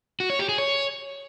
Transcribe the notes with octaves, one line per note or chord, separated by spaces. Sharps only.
F#4
C#5
G4
G#4
C#5